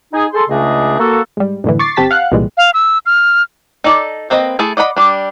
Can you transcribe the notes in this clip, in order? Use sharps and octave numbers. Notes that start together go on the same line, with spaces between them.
D#4 G#4
G#4 A4 C6
C#2 C#3 A3 D4 G#4 D#5
A#3 F#4 A4
G#2 G3
F#2 A2 D3 E3
C#6 D6 A6 C7
G1 C4 G4 A5 A6 B6
F5 F#5 F#6
C2 A#2 E3 G3 G#3
F5
E6
F6
D#4 A4 D5 A5
A#3 C4 B4 D#5
A3 E4 G#4 A5
D5 D#5 F#5 B5
G3 D4